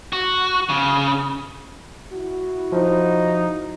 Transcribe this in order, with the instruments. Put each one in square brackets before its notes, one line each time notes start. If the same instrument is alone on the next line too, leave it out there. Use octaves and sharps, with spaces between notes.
[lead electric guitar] F#4
C#3
[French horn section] E4 F#4
[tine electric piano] F3 [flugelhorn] D#4